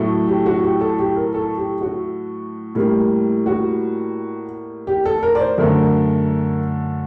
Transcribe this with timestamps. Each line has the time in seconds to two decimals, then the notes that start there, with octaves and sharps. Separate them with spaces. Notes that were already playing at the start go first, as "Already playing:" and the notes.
Already playing: A2 F#3 A3
0.28 G4
0.46 F#4
0.63 G4
0.81 A4
0.99 G4
1.16 A#4
1.34 A4
1.57 G4
1.81 F#4
2.75 A2 G3 A#3
3.46 F#4
4.87 G4
5.05 A4
5.23 A#4
5.35 D5
5.40 C5
5.58 F#2 D3 A3 A#4